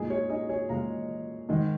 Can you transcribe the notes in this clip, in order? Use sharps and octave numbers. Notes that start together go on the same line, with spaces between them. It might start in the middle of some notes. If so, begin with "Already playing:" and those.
Already playing: A#2 G#3 D#4 G#4
G#4 C#5
D#4 G#4
G#4 C#5
A#2 G#3 F5 A#5
G#2 D#3 G#3